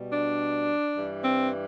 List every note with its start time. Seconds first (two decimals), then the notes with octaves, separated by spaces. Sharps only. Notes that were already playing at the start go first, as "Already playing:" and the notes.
Already playing: B2 G3
0.12 D4
0.96 G2 E3 G3
1.24 C4